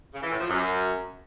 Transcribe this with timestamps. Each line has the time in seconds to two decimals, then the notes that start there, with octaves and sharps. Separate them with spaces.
0.14 C#3
0.23 E3
0.31 A2
0.40 F3
0.48 F#2